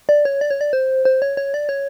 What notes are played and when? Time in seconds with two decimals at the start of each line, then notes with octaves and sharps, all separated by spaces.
0.09 D5
0.25 C#5
0.41 D5
0.51 C#5
0.61 D5
0.73 C5
1.05 C5
1.22 C#5
1.37 C#5
1.54 D5
1.69 C#5